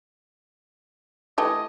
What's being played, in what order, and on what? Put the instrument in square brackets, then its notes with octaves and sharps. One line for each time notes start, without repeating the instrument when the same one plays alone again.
[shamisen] E3 A3 G4 [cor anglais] D#5